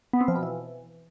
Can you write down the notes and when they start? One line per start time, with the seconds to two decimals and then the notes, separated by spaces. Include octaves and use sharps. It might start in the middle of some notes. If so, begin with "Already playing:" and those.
0.13 B3
0.21 C4
0.28 F3
0.35 B2
0.43 E3